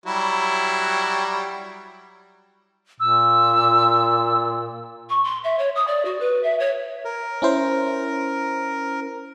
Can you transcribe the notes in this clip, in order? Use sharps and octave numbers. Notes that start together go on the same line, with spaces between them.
F#3 G3 E4
A#2 E6
C#6
C6
E5
C#5
D#6
D5
F#4
B4
E5
C#5
A#4
C#4 E4 C5